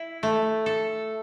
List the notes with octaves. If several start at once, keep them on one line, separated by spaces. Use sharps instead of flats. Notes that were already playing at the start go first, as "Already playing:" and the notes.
Already playing: E4
A3
A4